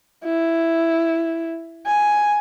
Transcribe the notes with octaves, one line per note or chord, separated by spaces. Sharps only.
E4
G#5